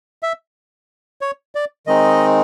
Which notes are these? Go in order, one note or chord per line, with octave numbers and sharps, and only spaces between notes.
E5
C#5
D5
D#3 G#3 C4 D#4 D#5